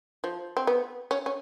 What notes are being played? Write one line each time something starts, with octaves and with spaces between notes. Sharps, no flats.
F3
C4
B3
C#4
C#4